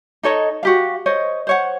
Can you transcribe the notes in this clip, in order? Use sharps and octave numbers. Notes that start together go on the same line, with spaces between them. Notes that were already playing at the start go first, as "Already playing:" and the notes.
D#4 A4 C#5 D#5
F#4 G4 F5
C5 C#5 D#5
C5 C#5 F#5